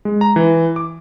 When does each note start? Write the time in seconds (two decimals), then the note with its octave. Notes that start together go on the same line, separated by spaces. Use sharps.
0.05 G#3
0.21 A#5
0.36 E3
0.76 D6